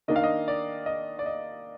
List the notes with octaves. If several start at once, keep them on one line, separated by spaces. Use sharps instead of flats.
D#3 A#3 D4 D#5
F5
D#5
D5
D#5
D5
D#5